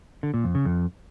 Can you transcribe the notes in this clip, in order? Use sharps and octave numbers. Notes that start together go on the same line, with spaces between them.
D3
A#2
F2
C#3
F2